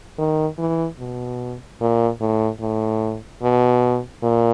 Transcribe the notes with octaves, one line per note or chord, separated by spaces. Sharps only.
D#3
E3
B2
A#2
A2
A2
B2
A#2